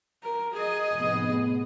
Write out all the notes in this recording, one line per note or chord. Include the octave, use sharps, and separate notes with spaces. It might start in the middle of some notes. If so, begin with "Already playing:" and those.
A#4
G#4 D#5
F1 A2 B3